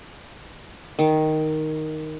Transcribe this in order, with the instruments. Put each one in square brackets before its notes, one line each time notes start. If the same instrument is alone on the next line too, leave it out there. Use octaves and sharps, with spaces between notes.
[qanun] D#3